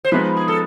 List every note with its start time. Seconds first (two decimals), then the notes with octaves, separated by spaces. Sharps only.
0.05 C5
0.11 F3 G#3 B3 D#4 B4
0.37 G#4
0.48 A4